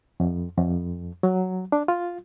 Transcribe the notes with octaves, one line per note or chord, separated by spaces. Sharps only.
F2
F2
F#3
D4
F4